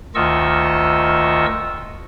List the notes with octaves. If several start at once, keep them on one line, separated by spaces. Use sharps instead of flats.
D2 D#3 F4 D#5 C#6 E6